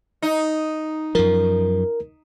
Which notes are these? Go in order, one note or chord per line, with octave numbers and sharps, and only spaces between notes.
D#4
F#2 F3 A#4